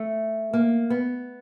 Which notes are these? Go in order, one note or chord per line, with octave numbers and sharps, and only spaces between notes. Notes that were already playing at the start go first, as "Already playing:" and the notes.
Already playing: A3
A#3
B3